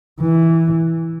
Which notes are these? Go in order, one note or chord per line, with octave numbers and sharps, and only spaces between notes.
E3